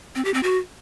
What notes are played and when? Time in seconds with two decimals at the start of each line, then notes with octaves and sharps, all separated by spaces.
0.15 C4
0.25 G4
0.34 C4
0.43 F#4